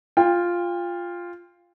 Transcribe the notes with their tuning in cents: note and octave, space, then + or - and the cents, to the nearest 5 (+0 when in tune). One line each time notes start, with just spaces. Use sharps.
F4 +0 G5 +30